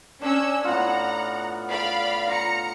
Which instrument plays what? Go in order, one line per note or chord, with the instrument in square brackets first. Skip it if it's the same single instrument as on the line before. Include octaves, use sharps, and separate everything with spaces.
[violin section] C#4 E6 [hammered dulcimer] D4
[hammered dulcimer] A2 B3 F4 [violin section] F#5 A#5
[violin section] D5 F5 B5
[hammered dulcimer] F4 [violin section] A#5 C#7